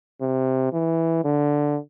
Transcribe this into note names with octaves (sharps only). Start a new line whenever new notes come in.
C3
E3
D3